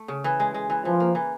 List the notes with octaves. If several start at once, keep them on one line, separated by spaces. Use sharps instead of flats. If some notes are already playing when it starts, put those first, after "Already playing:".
Already playing: A3
C#3
E3
G#3
G#3
E3
E3 F3
A#3
E3